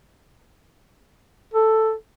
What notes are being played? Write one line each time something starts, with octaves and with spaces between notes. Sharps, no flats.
A4